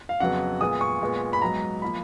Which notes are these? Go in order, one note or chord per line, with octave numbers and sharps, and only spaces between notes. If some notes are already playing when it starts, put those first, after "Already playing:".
F5
F2 C#3 F#3 B3 F#5
A#2 G#3 B3 D#6
C#6
A#2 G#3 B3
B5
G#2 F#3 B3 A#5
F3 A#3 B5